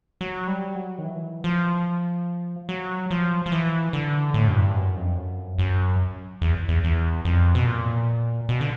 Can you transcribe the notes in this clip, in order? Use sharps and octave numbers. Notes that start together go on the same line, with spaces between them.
F#3
G3
F#3
D#3
E3
F3
F#3
F3
F3
E3
D3
A2
F#2
G2
F#2
F2
F#2
F#2
E2
E2
E2
F2
B2
A#2
B2
D3